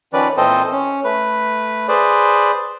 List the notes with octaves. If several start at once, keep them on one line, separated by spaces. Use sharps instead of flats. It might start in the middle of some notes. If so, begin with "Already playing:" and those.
D#3 F3 C#4 B4 D5
A#2 E3 C4 A4 C5 D#5
C#4
A3 B4
G#4 B4 C5 D5